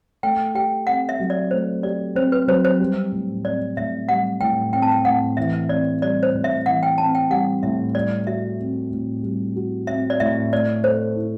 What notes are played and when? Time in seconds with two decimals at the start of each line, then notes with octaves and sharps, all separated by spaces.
0.23 A3 G5
0.55 G4 G5
0.87 C4 F#5
1.09 E5
1.20 F#3
1.30 D5
1.51 A3 C5
1.83 G4 D5
2.15 C4 C5
2.32 B4
2.48 F#3 C5
2.65 C5
2.80 G3
3.12 A2
3.45 C4 D5
3.77 A2 E5
4.09 G3 F#5
4.41 A2 G5
4.73 C4 G5
4.82 A5
4.92 G5
5.05 A2 F#5
5.37 E3 E5
5.69 C4 D5
6.02 G3 D5
6.23 C5
6.34 A2
6.44 E5
6.66 E3 F#5
6.83 G5
6.98 C4 A5
7.15 G5
7.30 G3 F#5
7.63 A2 E5
7.94 G3 D5
8.27 F#4 E5
8.60 C4
8.91 A2
9.23 G3
9.56 F#4
9.87 C4 E5
10.10 D5
10.20 A2 E5
10.52 A3 D5
10.84 A4 C5
11.16 E4